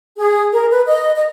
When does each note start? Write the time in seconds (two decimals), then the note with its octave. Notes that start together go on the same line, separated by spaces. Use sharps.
0.18 G#4
0.52 A#4
0.70 B4
0.87 D#5
1.15 D#5